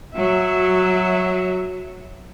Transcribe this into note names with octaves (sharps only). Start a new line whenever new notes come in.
F#3 E5